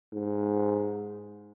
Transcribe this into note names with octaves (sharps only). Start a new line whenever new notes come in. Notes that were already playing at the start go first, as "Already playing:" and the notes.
G#2